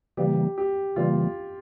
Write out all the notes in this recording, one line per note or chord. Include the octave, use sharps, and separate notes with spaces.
C#3 E3 G3 A#3 G4
G4
C#3 E3 G3 A#3 F4